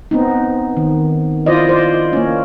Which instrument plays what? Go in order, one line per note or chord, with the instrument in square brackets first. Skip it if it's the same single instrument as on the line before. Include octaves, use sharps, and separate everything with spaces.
[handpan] B3 C4 D#4
D#3
E4 F4 C5 D5 D#5
C5 D5
A#3 C#4